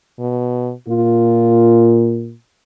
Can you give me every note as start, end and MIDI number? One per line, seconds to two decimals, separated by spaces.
0.19 0.72 47
0.88 2.34 46
0.88 2.15 65